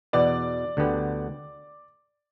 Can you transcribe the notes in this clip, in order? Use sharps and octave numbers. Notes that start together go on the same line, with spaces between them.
E2 B2 B3 D5
D2 D3 B3 G4